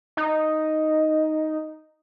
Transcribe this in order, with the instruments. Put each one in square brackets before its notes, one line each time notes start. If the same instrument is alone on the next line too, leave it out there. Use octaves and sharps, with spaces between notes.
[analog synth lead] D#4